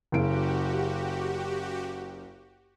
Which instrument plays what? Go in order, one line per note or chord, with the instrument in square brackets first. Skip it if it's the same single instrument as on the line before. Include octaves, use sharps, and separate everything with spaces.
[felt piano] F#1 C#3 D7 [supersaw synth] F#4 G4